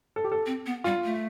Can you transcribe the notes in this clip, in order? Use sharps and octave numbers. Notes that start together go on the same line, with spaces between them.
A4
G4
A4
C4
B3
G3 F4
A3